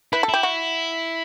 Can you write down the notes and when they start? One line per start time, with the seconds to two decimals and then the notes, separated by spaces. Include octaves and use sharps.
0.13 E4 B4
0.23 A4
0.29 E4 G4
0.43 F#4